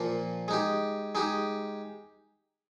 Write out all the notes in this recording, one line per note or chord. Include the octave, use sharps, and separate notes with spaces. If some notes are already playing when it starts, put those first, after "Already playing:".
Already playing: A#2 F3 A#3
G#3 D#4 G4
G#3 D#4 G4